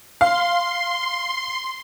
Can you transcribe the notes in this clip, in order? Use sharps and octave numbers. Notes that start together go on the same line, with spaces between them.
F5 C6